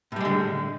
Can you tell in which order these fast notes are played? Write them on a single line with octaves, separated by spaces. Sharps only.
A2 G3 G#3 D3